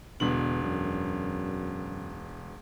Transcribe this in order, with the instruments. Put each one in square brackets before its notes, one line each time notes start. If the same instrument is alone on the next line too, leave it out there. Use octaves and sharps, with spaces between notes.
[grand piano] E1 D3 F#7 [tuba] B2
[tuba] F#2